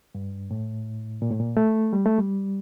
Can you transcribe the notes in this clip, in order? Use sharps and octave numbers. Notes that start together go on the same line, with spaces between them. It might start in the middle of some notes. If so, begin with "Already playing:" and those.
G2
A2
A#2
A2
A#2
A3
G3
A3
G3